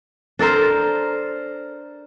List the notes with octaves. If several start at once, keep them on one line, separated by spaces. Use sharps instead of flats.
D4 A4 A#4 C5